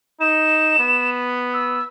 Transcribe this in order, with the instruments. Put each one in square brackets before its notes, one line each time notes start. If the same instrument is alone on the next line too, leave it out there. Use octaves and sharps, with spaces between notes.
[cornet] D#4 [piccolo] E7
[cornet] B3
[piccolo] E6